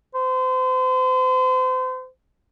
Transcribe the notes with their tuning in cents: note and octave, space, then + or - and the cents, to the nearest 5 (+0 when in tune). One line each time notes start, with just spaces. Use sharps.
C5 -35